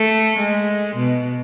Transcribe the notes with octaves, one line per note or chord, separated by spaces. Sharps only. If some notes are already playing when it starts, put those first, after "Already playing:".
Already playing: A3
G#3
B2